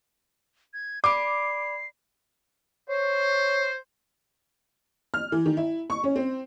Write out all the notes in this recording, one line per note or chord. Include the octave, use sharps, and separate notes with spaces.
G#6
D5 B5 D6 C7
C5 C#5
F6
E3
D#3
E4
C#6
C#4
C4